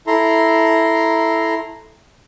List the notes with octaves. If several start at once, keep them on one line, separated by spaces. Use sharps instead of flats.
E4 A4 A#5 C6